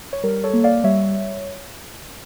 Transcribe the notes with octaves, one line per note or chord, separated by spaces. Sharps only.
C#5
G3 A#4
A4 C#5
A#3
D5 F5
G3 C#5 E5